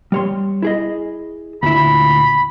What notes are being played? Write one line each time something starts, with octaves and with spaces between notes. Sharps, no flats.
G3 C#5 C6
E4 G#4 D#5
D2 A#2 E4 B5